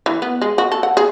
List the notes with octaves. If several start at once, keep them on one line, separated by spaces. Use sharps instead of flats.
E3
B3
G#3
F#4
A4
F#5
G#4